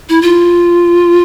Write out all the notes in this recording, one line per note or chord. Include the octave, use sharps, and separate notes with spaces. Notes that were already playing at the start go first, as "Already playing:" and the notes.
E4
F4